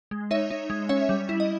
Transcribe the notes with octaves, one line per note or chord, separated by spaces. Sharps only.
G#3
D#4 C#5 E5
D#4
G#3
C#4 C#5 E5
G3
E4
D#5